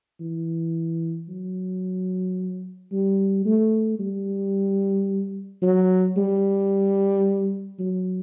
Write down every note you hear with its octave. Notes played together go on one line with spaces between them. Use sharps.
E3
F#3
G3
A3
G3
F#3
G3
F#3